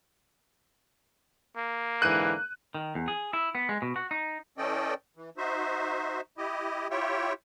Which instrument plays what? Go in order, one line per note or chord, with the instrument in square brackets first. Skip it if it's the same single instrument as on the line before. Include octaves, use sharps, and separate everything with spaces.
[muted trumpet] A#3
[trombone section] G#2 D3 E3 [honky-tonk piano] F#6 D#7
[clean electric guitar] D#3
E2
G#4
E4
B3
G#3
B2
F#4
D#4
[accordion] E3 C#4 A4 D5 D#5 G5
E3
D#4 F#4 C5 E5
E4 G4 D#5
E4 F4 G4 C#5 E5 G5